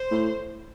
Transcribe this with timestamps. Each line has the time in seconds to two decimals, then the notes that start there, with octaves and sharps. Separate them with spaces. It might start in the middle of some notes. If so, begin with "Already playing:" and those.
Already playing: C5
0.11 A2